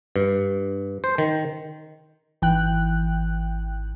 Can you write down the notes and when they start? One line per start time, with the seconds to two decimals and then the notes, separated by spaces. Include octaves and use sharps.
0.16 G2
1.04 C5
1.18 D#3
2.42 G#1 E3 G5 F#6